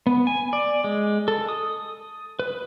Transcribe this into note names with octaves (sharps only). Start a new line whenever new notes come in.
B3
G#5
D5
G#3
A4
D#6
B4